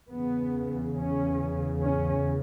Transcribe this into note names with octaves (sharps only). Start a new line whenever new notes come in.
E2 C#3 B3
C#4
C#4